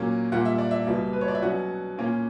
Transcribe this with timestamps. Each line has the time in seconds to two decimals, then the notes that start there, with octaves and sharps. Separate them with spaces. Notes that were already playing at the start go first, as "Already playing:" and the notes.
Already playing: A#2 F#3 A#3 C#4
0.32 A#2 G3 A#3 F#5
0.45 E5
0.58 D5
0.71 E5
0.87 C#2 B2 G3 A#3
1.13 B4
1.21 C#5
1.28 D5
1.35 E5
1.42 B2 F#3 C#4 F#5
1.98 A#2 A#3 C#4